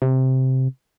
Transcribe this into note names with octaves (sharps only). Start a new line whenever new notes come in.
C3